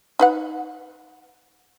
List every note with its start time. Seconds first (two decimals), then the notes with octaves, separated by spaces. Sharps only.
0.19 D#4 B4 F#5